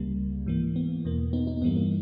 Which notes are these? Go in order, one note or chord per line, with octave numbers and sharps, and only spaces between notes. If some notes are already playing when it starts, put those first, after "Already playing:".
Already playing: C#2 C#3 G3 A#3
G#2 E3 A#3
B3
E2 B2 A#3
B3 D#4
B3 D#4
G2 E3 G3 A#3 B3
A#3